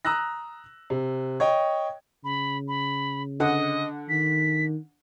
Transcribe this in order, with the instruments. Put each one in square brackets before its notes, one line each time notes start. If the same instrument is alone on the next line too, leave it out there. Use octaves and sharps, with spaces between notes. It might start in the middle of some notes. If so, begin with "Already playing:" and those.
[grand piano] A#5 D#6 E6 F#6 A#6
C3
C#5 D#5 G5
[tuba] C#3 [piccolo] B5
[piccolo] B5
[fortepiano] D3 F#5 [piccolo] D#5
[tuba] D#3 [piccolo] B6